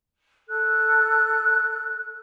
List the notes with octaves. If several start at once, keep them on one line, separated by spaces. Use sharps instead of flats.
A4 F#6